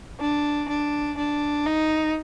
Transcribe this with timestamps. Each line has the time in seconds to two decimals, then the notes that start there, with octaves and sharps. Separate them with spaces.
0.20 D4
0.69 D4
1.17 D4
1.66 D#4